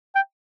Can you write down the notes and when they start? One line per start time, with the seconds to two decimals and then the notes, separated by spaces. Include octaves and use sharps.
0.15 G5